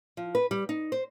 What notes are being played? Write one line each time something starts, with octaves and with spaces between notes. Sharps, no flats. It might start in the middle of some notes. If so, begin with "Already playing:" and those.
F3
B4
G3
D#4
C5